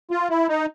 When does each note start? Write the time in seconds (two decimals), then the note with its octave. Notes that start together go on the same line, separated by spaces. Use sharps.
0.11 F4
0.30 E4
0.49 D#4